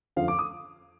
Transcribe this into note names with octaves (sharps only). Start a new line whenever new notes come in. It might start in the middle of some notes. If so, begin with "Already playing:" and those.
F2 D3 F3 F5
D6
D#6